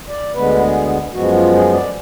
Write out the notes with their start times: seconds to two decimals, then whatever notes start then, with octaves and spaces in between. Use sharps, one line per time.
0.09 D5
0.34 D2 D3 G#3 B3 B4
0.61 G#4
1.13 F#2 F3 G#3 B3 F#4
1.33 F4
1.53 G#4
1.72 D5